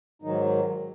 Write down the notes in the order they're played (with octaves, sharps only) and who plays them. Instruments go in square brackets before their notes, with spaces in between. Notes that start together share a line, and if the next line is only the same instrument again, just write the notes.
[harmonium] G#2 D#3 F#3 D#4